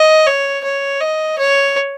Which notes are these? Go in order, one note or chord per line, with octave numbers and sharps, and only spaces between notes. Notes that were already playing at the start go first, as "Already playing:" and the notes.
Already playing: D#5
C#5
C#5
D#5
C#5